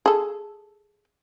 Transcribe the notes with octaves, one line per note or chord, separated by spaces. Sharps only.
G#4 A4